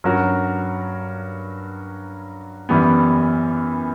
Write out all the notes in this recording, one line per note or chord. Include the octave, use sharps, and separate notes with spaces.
G2 F#3 C#4 F#4 A#4
F#2 E3 G3 B3